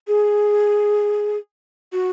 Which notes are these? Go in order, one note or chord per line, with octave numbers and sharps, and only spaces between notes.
G#4
F#4